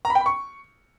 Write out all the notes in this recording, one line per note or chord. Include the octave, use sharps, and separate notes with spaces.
A#5
B5
G5
B5
C#6